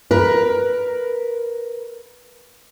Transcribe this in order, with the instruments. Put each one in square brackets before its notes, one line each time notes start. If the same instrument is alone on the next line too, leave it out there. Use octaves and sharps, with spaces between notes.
[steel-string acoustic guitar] A#4 B4